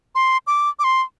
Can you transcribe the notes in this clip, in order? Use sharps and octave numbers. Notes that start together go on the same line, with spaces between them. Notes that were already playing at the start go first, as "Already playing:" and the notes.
C6
D6
D6
C6